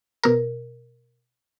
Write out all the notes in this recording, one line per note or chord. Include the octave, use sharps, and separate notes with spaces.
B2 A#4